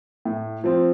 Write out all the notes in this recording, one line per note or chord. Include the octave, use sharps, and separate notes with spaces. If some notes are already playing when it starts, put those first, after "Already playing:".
A2
F3 C4